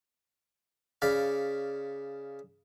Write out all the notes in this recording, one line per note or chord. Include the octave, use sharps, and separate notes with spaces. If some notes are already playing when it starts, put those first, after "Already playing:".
C#3 D5 F5 B5